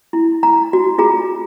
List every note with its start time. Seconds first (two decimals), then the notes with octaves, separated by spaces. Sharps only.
0.13 E4
0.43 A#5
0.73 F#4
0.98 F4 G#4 A#5